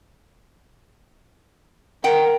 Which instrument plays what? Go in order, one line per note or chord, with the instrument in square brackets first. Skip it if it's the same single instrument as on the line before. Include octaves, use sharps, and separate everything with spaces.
[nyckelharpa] A#4 [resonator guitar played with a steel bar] F#5 G5